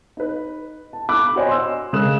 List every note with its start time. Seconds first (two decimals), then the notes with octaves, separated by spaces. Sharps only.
0.17 D#4 B4
0.93 A5
1.09 B5 D6 F#6
1.36 F#4 C5 C#5 D#5 G#5
1.49 C6 E6
1.93 C#3 G#3 A#4 D#6 F#6 E7